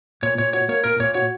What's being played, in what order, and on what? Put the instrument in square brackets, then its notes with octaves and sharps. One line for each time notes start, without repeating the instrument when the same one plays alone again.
[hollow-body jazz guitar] A#2 [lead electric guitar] C#5
[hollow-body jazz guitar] A#2 [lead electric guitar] C#5
[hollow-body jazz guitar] F#4 [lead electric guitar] C#5
[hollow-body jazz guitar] A#3 [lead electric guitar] C#5
[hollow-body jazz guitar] A#2 [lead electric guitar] A#4
[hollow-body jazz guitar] A#2 [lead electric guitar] C#5
[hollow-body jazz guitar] F#4 [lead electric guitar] C#5